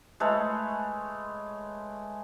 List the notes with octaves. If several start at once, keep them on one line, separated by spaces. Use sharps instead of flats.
G#3 A3 B4 C#5